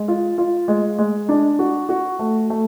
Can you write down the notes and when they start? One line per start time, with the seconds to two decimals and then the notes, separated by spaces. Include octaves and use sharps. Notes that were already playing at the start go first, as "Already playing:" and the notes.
Already playing: G#3
0.08 F4
0.38 F4
0.68 G#3
0.98 G#3
1.29 D4
1.59 F#4
1.89 F#4
2.19 A3
2.50 A3